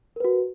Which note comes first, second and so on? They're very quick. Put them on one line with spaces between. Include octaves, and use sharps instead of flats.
A#4 B4 F#4